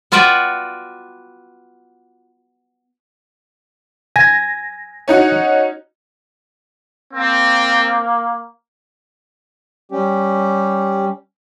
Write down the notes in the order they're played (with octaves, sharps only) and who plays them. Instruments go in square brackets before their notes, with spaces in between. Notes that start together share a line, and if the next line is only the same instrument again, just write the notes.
[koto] B3 F4 F#4 B4 D5 G5
[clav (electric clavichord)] G#5 [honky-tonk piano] A#6
[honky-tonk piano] C#4 D#4 F#4
[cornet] A#3 [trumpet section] C4
[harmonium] G3 C#4 G4